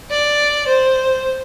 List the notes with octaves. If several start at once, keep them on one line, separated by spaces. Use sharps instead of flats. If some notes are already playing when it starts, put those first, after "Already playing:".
D5
C5